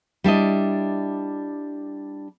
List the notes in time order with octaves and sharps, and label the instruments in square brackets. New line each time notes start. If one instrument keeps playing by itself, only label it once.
[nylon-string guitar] G3 D4 E4 D#5